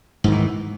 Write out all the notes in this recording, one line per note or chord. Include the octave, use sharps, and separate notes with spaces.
G#2 D#3 E3